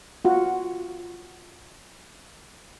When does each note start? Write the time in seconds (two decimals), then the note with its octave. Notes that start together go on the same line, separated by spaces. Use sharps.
0.25 F4 F#4